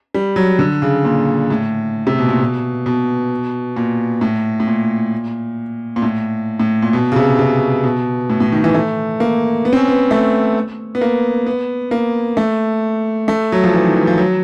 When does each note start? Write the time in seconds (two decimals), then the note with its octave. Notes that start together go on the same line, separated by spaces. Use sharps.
0.14 G3
0.36 F#3
0.59 D3
0.82 C#3
1.05 A#2
1.50 A2
2.07 C3
2.18 B2
2.29 A#2
2.40 B2
2.86 B2
3.76 A#2
4.21 A2
4.60 A2
4.67 A#2
5.96 A#2
6.02 A2
6.60 A2
6.82 A#2
6.93 B2
7.12 C#3
7.16 C3
7.39 C3
7.84 B2
8.30 A2
8.40 A2
8.52 D#3
8.64 E3
8.75 A3
9.20 A#3
9.65 B3
9.73 C4
9.77 C#4
9.88 B3
10.11 A3
10.95 B3
11.01 A#3
11.46 B3
11.91 A#3
12.37 A3
13.28 A3
13.52 F#3
13.64 F3
13.74 E3
13.84 D#3
13.96 E3
14.07 F3
14.18 F#3